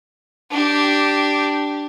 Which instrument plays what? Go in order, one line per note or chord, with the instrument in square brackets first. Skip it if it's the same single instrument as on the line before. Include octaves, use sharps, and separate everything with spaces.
[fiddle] D4 G4